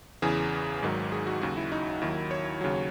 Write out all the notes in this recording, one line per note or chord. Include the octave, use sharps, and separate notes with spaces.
E2 C#3 E3 G#4
G#1 G#2 D#3 F#3
G#4
F#4
D#2 C#3 F#3 F#4
E4
D#4
D#2 D#3 F#3 E4
C#5
D#2 C#3 F#3